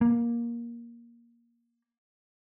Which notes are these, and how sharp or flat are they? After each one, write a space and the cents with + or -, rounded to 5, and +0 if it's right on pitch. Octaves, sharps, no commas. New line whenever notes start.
A#3 +15